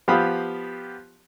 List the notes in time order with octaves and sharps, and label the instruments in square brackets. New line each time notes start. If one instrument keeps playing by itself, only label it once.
[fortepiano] F3 B3 G4 F5 B5 D#6